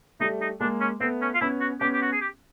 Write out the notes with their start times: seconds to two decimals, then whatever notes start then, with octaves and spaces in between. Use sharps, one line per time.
0.20 G3 A3 D#4
0.41 D#4
0.60 G#3 A#3 D4
0.80 C#4
1.00 A3 B3 C4
1.21 C#4
1.34 F4
1.41 B3 C#4 E4
1.60 F#4
1.81 B3 C#4 G4
1.93 G4
2.02 F#4
2.12 G#4
2.21 G4